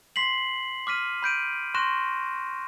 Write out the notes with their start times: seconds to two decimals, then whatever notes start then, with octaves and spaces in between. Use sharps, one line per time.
0.16 C6 B6 C7 F#7
0.87 D6 F6 B6 D#7
1.23 B5 G6 D7 D#7
1.74 C6 C#6 F#6 A#6 E7